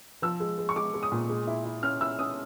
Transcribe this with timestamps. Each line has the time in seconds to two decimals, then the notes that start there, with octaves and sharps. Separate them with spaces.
0.22 F3 E6
0.40 G#3
0.58 G#3
0.69 C#6
0.76 G#3 D6
0.94 G#3
1.03 D#6
1.12 A#2
1.29 G#3
1.47 E4
1.65 E4
1.83 C#4 F6
2.01 E4 E6
2.19 C#4 D#6